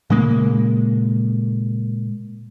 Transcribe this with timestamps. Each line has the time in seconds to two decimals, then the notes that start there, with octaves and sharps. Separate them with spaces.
0.10 A#2 C#3 G#3 A#3